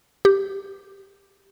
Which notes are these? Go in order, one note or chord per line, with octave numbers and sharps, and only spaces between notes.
G4